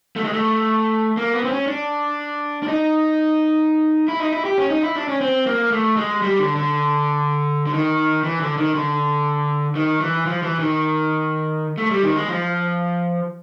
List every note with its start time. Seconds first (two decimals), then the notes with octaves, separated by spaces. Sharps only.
0.16 A3
0.24 G#3
0.33 A3
1.17 A#3
1.34 B3
1.44 C4
1.51 C#4
1.67 D4
2.63 D4
2.68 D#4
4.08 E4
4.20 D#4
4.32 E4
4.45 G4
4.58 C#4
4.70 D#4
4.83 E4
4.95 D4
5.09 C#4
5.21 C4
5.46 A#3
5.72 A3
5.97 G#3
6.22 G3
6.39 D3
6.56 D3
7.66 D3
7.74 D#3
8.24 E3
8.41 D3
8.57 D#3
8.75 D3
9.76 D#3
10.01 E3
10.26 F3
10.43 E3
10.60 D#3
11.78 A3
11.91 G3
12.03 D#3
12.16 G#3
12.28 F3